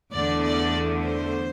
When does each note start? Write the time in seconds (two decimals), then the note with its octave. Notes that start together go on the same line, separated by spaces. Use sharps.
0.13 E2 D3 A3 D5
0.43 D5
1.03 C5